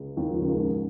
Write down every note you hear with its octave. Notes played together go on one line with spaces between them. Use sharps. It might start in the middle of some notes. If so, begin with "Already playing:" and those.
Already playing: C#2 C#3
D#2 D#3
F2 F3
C#2 C#3
G#2